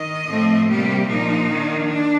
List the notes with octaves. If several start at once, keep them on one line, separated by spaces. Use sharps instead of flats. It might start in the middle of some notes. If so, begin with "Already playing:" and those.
Already playing: D#3 D#5
A2 F3 A3 C4
C3 G3 A#3 G4
A#2 F3 A#3 D4 D#4
D#3 A#3 D4
D4